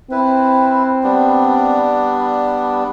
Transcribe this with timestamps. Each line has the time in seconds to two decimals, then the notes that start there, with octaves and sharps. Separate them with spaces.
0.11 C4 E4 B4
1.03 G3 B3 D4